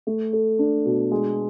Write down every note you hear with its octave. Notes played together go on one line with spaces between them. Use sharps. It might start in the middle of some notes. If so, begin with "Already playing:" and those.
A3
A4
D4
B2
G#3